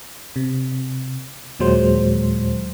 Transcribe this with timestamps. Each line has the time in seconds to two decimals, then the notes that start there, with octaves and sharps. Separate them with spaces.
0.36 C3
1.59 D#2 A#2 F#3 G#3 C5